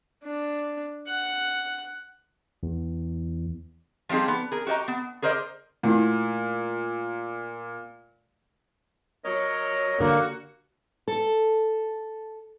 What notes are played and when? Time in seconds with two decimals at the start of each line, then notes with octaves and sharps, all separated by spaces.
0.24 D4
1.08 F#5
2.63 E2
4.09 F3 G3 C4 D#4 G#4
4.28 B3
4.52 G#4 A#4
4.67 F#4 G4 C#5 D#5 A#5
4.88 B3
5.22 G#4 A#4 C5 D5 D#5
5.83 A#2 A3 E4
9.24 F#3 A#4 C#5 D#5
10.00 D3 A#3 D4 F#4 A#4
11.08 A4